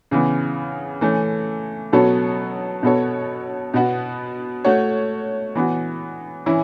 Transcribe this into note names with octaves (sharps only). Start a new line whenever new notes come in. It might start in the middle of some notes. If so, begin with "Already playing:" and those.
C#3 E3 B3
E3 A3 C#4
B2 F#3 B3 A4 C#5
B2 B3 F#4 A4 C#5
B2 B3 F#4
A3 F#4 C#5
E3 B3 F#4
E3 C#4 E4